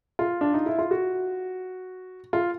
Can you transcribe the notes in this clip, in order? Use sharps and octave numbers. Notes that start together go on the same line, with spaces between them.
F4
D4
D#4
E4
F4
F#4
F4